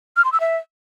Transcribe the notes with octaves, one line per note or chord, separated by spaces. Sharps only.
F6
C6
E6
E5